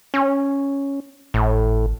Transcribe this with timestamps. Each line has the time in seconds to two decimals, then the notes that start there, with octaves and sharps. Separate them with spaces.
0.14 C#4
1.34 G#1 A2